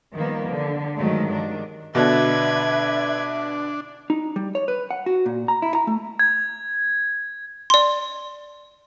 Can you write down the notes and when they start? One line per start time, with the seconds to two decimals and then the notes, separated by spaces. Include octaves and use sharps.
0.13 D#3 F3 G3 A#3 B3
0.49 D3
0.97 G2 D#3 F3 F#3 G#3 A3
1.31 D#3 D4
1.95 B2 D3 D4 B4 E5 G#6
4.10 D#4
4.36 G3
4.55 C#5
4.68 B4
4.91 F#5
5.06 F#4
5.26 A#2
5.48 A#5
5.62 E4
5.75 A#5
5.87 A3
6.19 G#6
7.70 D5 C6